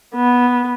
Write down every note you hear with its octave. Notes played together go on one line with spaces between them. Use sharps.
B3